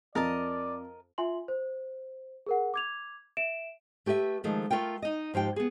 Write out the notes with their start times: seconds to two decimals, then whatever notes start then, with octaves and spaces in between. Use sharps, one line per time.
0.15 F2 A#4 D5 D#5 A5
1.18 F4 E5 G#5 C6 F#7
1.48 C5
2.47 G#4 A#4 F#5
2.74 D6 G#6 F7
3.37 E5 D7 E7
4.06 A3 G4 B4 D5 E5
4.44 D#3 F3 G#3 A3
4.71 A3 F4 A#4 G5
5.02 D#4 D#5
5.34 G#2 F3 G4 G5
5.56 B3 G#4